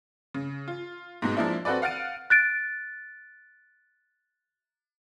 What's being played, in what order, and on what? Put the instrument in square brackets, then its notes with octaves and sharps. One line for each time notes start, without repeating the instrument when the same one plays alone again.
[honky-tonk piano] C#3
F4
G#2 B2 G#3
F3 G#3 A#3 D4 E4
C4 F#4 A4 B4 D5
F5 F#5 F6 A6 D7 D#7
[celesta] F#6 A6 D7